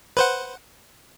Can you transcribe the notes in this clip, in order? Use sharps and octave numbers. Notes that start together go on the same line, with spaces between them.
B4 C5 F#5